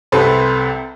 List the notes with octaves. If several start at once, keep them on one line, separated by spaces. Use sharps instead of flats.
C2 C3 A4 B4 C5 C6